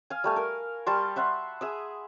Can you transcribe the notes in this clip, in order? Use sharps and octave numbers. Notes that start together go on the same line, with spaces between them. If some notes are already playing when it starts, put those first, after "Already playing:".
F5 G#5
G3 A3 G#5
A#4
G3 A5 C6 C#6
E5 F#5 B5 C6
G#4 E5 D#6